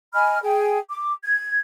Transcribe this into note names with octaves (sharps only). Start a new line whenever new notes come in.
D#5 G#5 B5 F6
G#4 G5
D6
G#6